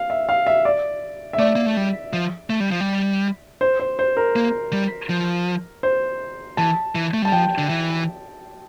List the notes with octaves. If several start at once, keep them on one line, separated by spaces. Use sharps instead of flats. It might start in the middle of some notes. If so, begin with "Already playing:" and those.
Already playing: F5
E5
F5
E5
D5
E5
A3 D5
A#3
A3
G3
F3
A3
G3
F3
G3
C5
C5
C5
A#4
A#3
G3
F3
C5
E3 A5
E3
A3
G3 A5
F3 G5
D3
E3